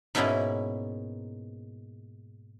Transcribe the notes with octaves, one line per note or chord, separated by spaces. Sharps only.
G#2 B2 A#3 C#4 E4 G#4